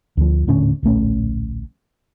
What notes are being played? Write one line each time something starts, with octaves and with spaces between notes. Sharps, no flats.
D2 F3
D#1 A2 D3 C#4
D1 A#1 A3 C#4